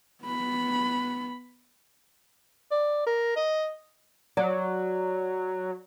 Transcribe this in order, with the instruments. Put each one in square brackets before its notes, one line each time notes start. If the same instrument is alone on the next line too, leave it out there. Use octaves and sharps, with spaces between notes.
[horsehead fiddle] B3 B5
[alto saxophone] D5
A#4
D#5
[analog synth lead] F#3 [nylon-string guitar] D5